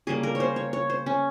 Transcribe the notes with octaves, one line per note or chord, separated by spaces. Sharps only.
C#3 G3 A#3 G#4
A#4
C#5
C5
C#5
C#5
C5
C#4